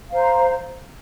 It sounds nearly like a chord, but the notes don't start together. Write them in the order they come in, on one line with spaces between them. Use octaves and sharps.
F5 C5 A#5